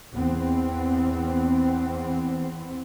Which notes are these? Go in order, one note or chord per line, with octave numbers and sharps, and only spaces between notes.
E2 B3 C4